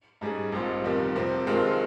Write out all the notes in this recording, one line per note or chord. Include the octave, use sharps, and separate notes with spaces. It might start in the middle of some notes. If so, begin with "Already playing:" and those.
G#2 G3 C#4 G#4
A#1 G#2 G3 C4 F4
G1 F2 D#3 G3
F2 C3 F3 C4
G2 D#3 G#3 C4 F4